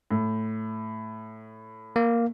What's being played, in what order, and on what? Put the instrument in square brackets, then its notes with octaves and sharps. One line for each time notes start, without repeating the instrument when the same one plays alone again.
[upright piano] A2
[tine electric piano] A#3